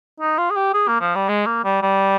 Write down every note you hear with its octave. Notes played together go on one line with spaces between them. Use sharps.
D#4
F4
G#4
G4
G#4
A#3
F3
G3
G#3
A#3
G3
G3